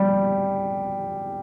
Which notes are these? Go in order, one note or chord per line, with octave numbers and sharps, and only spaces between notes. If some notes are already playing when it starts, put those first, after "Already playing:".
Already playing: G3